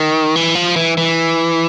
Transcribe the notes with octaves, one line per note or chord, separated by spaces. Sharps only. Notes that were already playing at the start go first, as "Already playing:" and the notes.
Already playing: D#3
E3
F3
E3
E3